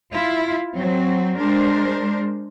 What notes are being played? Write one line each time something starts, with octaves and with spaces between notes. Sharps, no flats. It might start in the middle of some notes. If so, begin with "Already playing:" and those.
E4 F4
F#3 C4
G#3 D4 A#4 C5